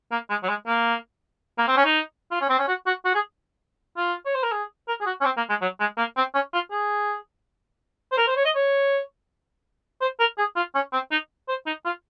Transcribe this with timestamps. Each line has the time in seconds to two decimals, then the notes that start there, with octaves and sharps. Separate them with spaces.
0.12 A#3
0.30 G#3
0.43 F#3
0.49 G#3
0.67 A#3
1.58 A#3
1.68 C4
1.77 C#4
1.85 D#4
2.31 F4
2.41 C#4
2.50 C4
2.59 C#4
2.68 F#4
2.86 F#4
3.05 F#4
3.14 G#4
3.97 F4
4.26 C#5
4.35 C5
4.43 A#4
4.52 G#4
4.88 A#4
5.01 G#4
5.06 F#4
5.21 C#4
5.25 C4
5.37 A#3
5.49 G#3
5.61 F#3
5.80 G#3
5.98 A#3
6.17 C4
6.34 C#4
6.53 F4
6.71 G#4
8.12 C5
8.18 A#4
8.27 C5
8.36 C#5
8.45 D#5
8.55 C#5
10.01 C5
10.20 A#4
10.38 G#4
10.56 F4
10.75 C#4
10.93 C4
11.11 D#4
11.48 C5
11.66 D#4
11.85 F4